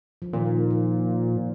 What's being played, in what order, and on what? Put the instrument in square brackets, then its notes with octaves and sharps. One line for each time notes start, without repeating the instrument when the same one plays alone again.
[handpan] F3
[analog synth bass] A#2 [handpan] D#3
[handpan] F3